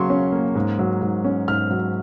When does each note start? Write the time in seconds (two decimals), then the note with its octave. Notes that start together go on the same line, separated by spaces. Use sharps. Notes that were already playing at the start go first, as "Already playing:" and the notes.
Already playing: C#3 F#3 A#3 C6 C#6
0.10 C#4
0.32 A#3
0.55 G#2
0.79 F#3
1.02 G#2
1.24 C#4
1.48 G#2 F6
1.71 F#3